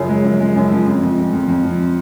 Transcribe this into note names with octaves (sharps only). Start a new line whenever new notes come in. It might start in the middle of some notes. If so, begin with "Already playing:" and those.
Already playing: F#2 C#3 F3
G#3
F#2
G#3
F#2
F3
F2
F2
F2
F2
F2
F3